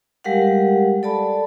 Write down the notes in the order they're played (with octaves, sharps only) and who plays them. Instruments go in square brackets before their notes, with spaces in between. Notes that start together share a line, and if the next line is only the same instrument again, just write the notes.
[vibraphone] G3 G#3 G4 A#4 F5 F#5
A4 D5 A5 B5